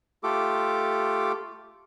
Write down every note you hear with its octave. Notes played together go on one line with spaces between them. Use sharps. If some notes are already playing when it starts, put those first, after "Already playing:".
A3 F4 G4 A4 D6